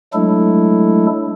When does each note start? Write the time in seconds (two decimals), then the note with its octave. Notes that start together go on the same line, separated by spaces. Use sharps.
0.14 F#3 G#3 A3 D4 E4 A4